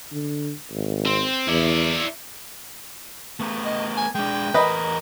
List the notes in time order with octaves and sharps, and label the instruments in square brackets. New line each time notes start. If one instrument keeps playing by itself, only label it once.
[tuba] D3
G#1
[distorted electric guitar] C4
[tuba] E2 [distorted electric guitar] E4 D5
[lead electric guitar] A3 B3
[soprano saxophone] D#5
G#5
[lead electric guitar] G#3 D4 [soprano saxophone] G5
[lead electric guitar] E2 A#4 [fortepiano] B4 D#5